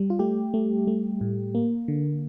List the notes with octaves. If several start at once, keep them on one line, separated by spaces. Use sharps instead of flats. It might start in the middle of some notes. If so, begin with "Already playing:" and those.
Already playing: G3
F4
A3 G4
A3
A3
A2
A#3
D3